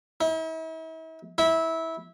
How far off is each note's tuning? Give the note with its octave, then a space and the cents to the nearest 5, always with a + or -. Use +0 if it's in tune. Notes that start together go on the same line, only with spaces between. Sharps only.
E4 -45
E4 -20